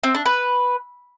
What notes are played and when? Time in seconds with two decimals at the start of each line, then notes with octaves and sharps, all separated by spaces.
0.04 C4
0.15 D4
0.26 B4